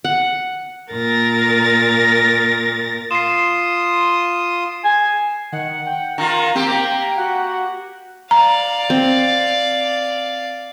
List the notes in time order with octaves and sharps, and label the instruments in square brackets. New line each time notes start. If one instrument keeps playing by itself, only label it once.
[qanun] F#5
[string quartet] A#2 A#4 A6 A#6
[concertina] F4 C6 D#6 [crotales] C7 E7
[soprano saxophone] G#5
[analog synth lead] D#3 [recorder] F#5
[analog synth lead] G5
[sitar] D#3 F4 [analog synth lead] A#4 [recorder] A#5
[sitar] A#3 G4 [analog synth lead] C4
[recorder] G5 [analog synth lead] A#5
[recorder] F#4 [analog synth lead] F#5
[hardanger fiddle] D5 F5 [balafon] A#5
[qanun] C4